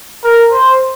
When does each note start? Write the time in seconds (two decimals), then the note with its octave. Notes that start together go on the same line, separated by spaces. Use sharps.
0.24 A#4
0.52 C5